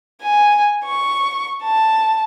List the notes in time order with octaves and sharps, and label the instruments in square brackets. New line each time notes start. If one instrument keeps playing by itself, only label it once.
[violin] G#5
C#6
A5